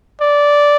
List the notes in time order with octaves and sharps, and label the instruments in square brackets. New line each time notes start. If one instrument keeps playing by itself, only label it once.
[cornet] D5